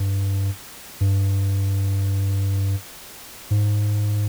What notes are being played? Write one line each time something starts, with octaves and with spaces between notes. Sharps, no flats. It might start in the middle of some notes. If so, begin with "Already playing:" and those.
Already playing: G2
G2
G#2